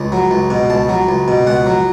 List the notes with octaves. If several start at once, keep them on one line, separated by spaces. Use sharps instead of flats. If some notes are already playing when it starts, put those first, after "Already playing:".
Already playing: C#2
F#3
C#2
B2
C#2 A5
F#3
C#2
B2
C#2 F#5
F#3